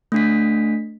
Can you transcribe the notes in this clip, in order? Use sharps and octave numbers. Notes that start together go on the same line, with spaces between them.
A3 D4 B6